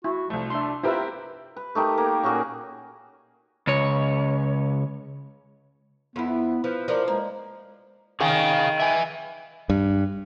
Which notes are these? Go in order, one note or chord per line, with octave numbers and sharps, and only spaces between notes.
E4 F#4
C2 F3 A3
D4 E5 C6
C4 E4 F4 G4 A#4 B4 E5
B4
A3 D#4 G4 A#4
A#3 G5
A#2 C#4 F#4 G#4
C#2 C#5
F2 B3 E4
F3 B4
F3 D4 A#4 C5 D5
G#3 A#3
D#3 G#4 F5 G#5
E5 G#5
G2